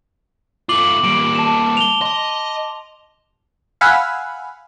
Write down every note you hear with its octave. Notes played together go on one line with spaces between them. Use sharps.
A3 F4 D6 F#7
G3 A#3 D7
A5 E7
F7 G7
D#5 C6
F5 F#5 G#5 B5 E6